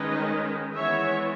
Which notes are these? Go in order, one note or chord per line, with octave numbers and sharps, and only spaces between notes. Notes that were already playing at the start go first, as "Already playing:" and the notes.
Already playing: D#3 G#3 C#4 B4 D#5
E3 G#3 B3 C#5 E5